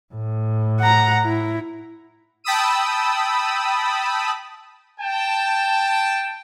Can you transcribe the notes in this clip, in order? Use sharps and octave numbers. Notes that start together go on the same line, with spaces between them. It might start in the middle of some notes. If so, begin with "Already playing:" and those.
A2
F#5 A#5
E4
G5 A5 B5 D#6 E6 D#7
G5 A5